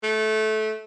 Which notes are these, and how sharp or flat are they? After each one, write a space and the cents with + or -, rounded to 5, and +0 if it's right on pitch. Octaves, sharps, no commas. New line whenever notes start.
A3 -20